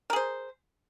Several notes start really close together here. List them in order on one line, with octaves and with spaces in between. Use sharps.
A#4 G#4 C5